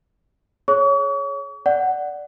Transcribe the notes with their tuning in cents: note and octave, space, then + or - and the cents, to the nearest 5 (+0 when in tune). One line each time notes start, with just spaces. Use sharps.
G#4 +30 C#5 +0 C#6 +40
D5 +0 F#5 +5